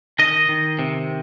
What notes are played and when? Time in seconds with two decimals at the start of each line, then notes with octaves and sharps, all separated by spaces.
0.19 D#3 D#5
0.49 D#3
0.79 C3